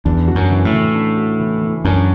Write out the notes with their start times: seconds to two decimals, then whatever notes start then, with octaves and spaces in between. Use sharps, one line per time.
0.05 E2 D4
0.28 F#4
0.35 F#2
0.50 E3
0.65 A2
0.72 E3
0.95 D4
1.17 F#4
1.39 E3
1.62 E3
1.84 F#2 D4